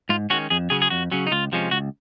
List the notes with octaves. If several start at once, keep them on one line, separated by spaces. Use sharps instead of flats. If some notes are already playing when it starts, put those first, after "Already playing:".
G#2 F4
D#3 G#3 C#4 F#4
F2 G#4
C#3 F#3 C#4 G#4
G#4
F2 F#4
C#3 F#3 C#4
D#4
C#2 F4
C3 F3 G#3 C#4
C#2 F#4